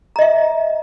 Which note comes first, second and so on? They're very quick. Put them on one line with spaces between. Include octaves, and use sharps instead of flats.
A#5 D#5 E5